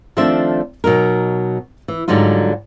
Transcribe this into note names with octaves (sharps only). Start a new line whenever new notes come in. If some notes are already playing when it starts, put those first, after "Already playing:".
D#3 F3 A3 C4 D4 E5
B2 F#3 D#4 A#4
E3
G#2 D3 F#3 G3 D#4 F4